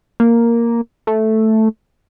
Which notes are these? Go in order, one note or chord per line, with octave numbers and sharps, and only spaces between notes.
A#3
A3